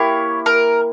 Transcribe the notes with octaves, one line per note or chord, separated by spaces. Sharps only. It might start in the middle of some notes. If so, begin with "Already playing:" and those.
Already playing: A#3 E4 G4 C#5
A#4